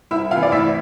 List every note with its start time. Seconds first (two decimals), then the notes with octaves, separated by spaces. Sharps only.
0.11 C2 E4 E5
0.31 C3 F4 F5
0.36 E3
0.43 D5
0.52 D2 E4 E5